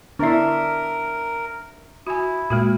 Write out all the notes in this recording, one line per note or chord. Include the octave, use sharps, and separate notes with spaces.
D3 B3 D4 E4 A#4 E5
E4 F#4 G#5
A#2 G#3 A#3 F#4